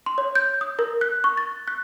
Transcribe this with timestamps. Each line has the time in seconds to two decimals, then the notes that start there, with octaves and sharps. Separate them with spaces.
0.06 C6
0.18 C#5
0.35 G6
0.61 D#6
0.79 A#4
1.01 F#6
1.24 C#6
1.37 A6
1.68 F#6